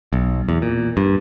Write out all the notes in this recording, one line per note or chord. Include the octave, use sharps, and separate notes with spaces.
B1
E2
A#2
G2